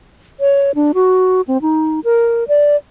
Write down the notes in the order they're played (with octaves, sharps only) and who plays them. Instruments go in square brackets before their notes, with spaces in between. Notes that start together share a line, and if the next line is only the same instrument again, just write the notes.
[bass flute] C#5
D4
F#4
C4
D#4
A#4
D5